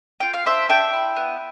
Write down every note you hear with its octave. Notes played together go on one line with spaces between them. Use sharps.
F4 G5
F5
D4 C5 E5
D4 E5 G5
E4
B3